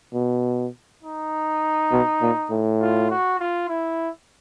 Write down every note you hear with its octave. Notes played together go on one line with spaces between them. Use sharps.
B2
D#4
B2
A#2
A2
F4
F#4
F4
E4